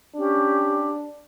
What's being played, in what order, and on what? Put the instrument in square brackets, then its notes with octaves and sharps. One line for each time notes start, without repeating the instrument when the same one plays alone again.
[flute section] C#4 G4 [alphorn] D4